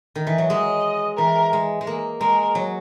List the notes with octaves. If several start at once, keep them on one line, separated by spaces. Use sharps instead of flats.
D#3
E3
F#3
G#3 D#5
E3 A#4
G#3
G#3
A#3
G#3 A#4
F#3